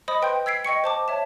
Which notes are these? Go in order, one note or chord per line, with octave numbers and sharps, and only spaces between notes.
C5 D#5 B5 D#6
B4 G5 C6 G6
E6 G#6 B6 C7 D7
D#5 G5 C#6 C#7
C5 A5 D6
C#5 E5 A5